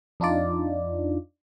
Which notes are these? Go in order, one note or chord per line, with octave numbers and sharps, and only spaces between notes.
F2 D4 D#4 F4 D5